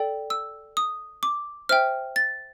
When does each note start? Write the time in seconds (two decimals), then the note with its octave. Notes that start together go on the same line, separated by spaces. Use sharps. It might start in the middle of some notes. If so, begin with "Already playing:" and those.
Already playing: A4 D5 G5
0.30 E6
0.77 D#6
1.23 D6
1.69 C5 E5 G5 F6
2.16 A6